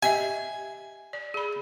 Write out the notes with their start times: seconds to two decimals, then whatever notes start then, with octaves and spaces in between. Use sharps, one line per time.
0.03 G4 D#5 E5 G#5
1.13 D5
1.34 G#4 B5